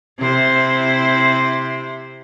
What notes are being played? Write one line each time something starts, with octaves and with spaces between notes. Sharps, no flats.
C3 E4 C5